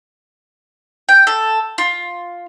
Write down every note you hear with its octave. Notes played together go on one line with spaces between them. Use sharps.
G5
A4
F4